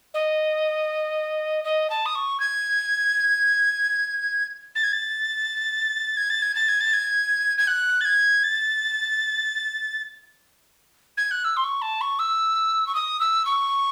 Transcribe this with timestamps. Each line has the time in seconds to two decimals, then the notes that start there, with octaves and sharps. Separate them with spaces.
0.14 D#5
1.64 D#5
1.90 A5
2.05 D#6
2.15 C#6
2.40 G#6
4.75 A6
4.83 G#6
4.92 A6
6.16 G#6
6.30 A6
6.42 G#6
6.55 A6
6.68 G#6
6.80 A6
6.93 G#6
7.58 G#6
7.67 F#6
8.00 A6
8.05 G#6
8.43 A6
11.17 G#6
11.31 F#6
11.44 E6
11.56 C6
11.63 C#6
11.81 A5
12.01 C#6
12.19 E6
12.86 C#6
12.94 D#6
13.20 E6
13.45 C#6